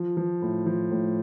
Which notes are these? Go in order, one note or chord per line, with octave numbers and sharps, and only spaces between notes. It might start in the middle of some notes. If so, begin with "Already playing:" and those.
Already playing: F3
F3
A2
F3
A2